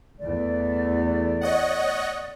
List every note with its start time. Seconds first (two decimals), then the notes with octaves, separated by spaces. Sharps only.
0.19 E2 A3 D5
1.41 C#5 D#5 F#5